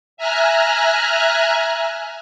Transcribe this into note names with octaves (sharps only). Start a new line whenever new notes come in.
E5 G#5 A#5 F6 F#6